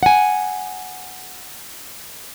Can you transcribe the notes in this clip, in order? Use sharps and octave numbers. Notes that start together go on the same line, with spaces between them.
F#5 G#5